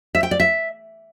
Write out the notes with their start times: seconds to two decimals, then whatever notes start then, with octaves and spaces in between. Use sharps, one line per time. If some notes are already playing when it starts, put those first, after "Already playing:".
0.15 E5
0.23 G5
0.31 D5
0.40 E5